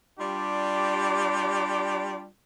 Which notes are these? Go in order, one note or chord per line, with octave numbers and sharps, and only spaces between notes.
G3 D4 F4 G4